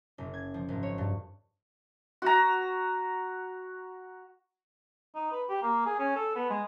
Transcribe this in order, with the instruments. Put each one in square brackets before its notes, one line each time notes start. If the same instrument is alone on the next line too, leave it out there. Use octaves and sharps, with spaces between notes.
[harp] F#1
G#6
F3
G#1
C#5
G2
[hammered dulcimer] F#4 A#5
[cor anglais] D#4
B4
G4
A#3
G#4
C#4
A4
B3
G#3